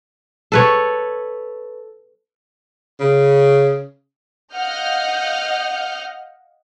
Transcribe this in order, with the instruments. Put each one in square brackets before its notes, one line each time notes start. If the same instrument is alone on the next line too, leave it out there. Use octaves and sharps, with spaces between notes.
[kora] A4 B4 C#5
[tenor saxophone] C#3
[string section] D#5 F5 F#5 F6 G6